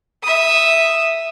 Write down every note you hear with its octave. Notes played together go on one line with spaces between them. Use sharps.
E5 D#6